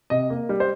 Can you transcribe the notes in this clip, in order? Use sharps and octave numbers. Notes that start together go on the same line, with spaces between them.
C3 D#5
A#3
G3
C5